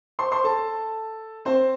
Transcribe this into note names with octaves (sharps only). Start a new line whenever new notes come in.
C5 C6
C5 C6
A4 A5
C4 C5